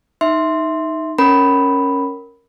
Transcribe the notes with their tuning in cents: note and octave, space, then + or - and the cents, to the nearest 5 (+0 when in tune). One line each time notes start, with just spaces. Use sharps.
D#4 +0 E5 -5 C6 +0
C#4 +0 A#4 +0 B5 +0